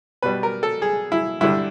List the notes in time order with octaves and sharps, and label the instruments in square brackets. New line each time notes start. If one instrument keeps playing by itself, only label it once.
[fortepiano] B2 G3 B4
A#4
A4
G#4
E4
G2 D3 G3 E4